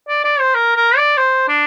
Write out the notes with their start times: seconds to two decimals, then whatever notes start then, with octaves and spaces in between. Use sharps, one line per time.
0.09 D5
0.24 D5
0.40 C5
0.55 A#4
0.76 A#4
0.97 D5
1.18 C5
1.48 D4